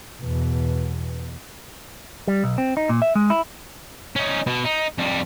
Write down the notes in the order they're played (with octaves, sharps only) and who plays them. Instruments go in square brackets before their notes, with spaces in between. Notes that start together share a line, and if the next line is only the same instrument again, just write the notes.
[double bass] E2 B2
[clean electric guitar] G3
B1
C4
D#4
A#2
E5
G#3
E4
[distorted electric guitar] C#4 D#4
B2
D#4
F2 G3